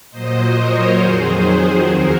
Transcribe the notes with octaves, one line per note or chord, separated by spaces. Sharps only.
A#2 F#3 C5 D#5
A#4 C#5
F2 D#3 F#3 G#4 C5
D#2 F#4 A#4